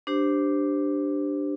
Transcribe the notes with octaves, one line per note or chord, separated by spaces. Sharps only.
D4 G4 C5